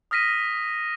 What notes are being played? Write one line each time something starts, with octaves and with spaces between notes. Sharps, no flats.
D#6 F6 A#6 B6 D#7